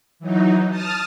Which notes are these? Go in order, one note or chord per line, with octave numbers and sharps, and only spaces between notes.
E3 F#3 D#4
A5 D#6 F6